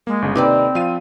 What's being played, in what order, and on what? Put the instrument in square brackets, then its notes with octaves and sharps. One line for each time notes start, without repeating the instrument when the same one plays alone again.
[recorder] G#3 [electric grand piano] A#3
[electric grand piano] G1 C#3
[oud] D#2 B4 D5 [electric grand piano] C3 D#4 D6 [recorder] C4
[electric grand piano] F3 F4 D#7 [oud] F5